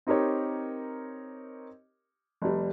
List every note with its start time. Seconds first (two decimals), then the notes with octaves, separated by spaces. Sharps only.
0.07 C4 D#4 G4 A#4 C#5
2.42 F1 G3